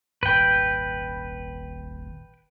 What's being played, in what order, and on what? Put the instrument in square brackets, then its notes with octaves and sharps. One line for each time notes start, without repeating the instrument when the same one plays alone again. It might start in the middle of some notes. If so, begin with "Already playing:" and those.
[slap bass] D#1 G#1 G#2 [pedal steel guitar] B4 G5